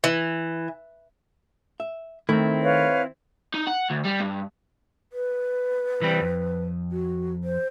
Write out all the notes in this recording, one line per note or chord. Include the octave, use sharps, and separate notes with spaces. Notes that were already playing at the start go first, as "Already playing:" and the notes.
E3
E5
D#3 A3 C4 E4
B4 C#5 F5
D#4
F#5
D2
G3
G2
B4
E3 G3 C4
F2
F#4
C5